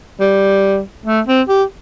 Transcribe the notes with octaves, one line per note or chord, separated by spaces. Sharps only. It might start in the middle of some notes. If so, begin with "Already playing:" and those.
G3
A3
C4
G4